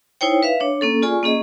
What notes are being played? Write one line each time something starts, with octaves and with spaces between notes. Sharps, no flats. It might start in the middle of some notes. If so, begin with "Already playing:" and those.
D#4 E4 C5 C#5 G5
B4 E5 F5
D4 C#5
A#3 C#4 A4
F4 G#4 D5 G#5 C#6
A#3 C#4 G#4 D#5